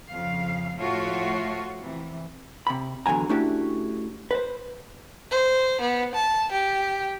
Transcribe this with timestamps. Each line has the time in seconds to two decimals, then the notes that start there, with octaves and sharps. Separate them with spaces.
0.11 F2 C#3 F5
0.79 A2 F3 A3 F4 F#4 C#5
1.80 C3 E3
2.67 C3 B5
3.06 E2 D3 F#3 G#5 A#5
3.29 A3 C#4 D4 E4 F#4 G4
4.31 B4 C5
5.31 C5
5.81 B3
6.14 A5
6.52 G4